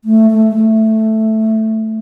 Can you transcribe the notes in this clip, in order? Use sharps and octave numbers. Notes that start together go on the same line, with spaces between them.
A3
A3
G#3
A3